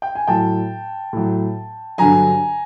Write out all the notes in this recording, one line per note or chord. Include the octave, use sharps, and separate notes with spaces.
G5
G#5
A2 F#3 G5 A5
A2 F#3
G2 D3 F#3 G#5 A#5